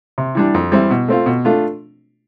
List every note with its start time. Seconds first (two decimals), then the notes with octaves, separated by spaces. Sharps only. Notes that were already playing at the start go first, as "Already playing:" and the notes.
0.18 C3
0.35 E3 G3 D4
0.54 F2
0.72 E3 G3 C4 E4
0.90 B2
1.08 A3 C4 F4
1.26 B2
1.45 A3 D4 F4